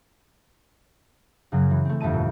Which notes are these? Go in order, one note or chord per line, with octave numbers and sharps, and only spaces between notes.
F#2 C#3 F#3
E3
A3 C4
G1 F2 E5 A5 D#7
A#2